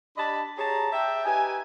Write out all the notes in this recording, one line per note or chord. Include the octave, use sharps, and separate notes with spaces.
D4 G4 D#5 A5 B5
G4 G#4 C#5 A5 A#5
E5 G5
D#4 G4 B4 G#5